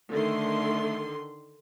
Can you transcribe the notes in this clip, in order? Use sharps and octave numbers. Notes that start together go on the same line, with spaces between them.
D3 D#3 A3 C6